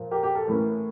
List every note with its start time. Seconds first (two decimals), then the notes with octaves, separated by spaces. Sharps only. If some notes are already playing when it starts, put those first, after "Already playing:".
Already playing: A#2 F3 A#3
0.11 G4 A#4
0.23 G4
0.35 A4
0.47 A2 E3 A#3 C#4